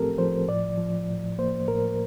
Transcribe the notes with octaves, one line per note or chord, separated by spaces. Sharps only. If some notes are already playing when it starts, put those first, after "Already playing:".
Already playing: A2 F3 A3 C4 G4 A4 A#4
F3 C5
A2 D5
F3
A2
A#3 C5
A2 A#4